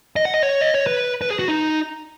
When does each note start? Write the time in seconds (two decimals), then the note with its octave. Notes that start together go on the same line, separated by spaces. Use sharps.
0.16 D#5
0.25 F#5
0.34 D#5
0.43 C#5
0.61 D#5
0.74 C#5
0.87 B4
1.22 B4
1.30 G#4
1.39 F#4
1.48 D#4